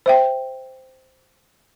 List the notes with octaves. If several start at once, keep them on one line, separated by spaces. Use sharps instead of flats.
C5 E5 G5